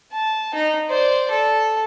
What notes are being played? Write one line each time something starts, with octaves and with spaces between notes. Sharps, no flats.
A5
D#4
C5 D5
A4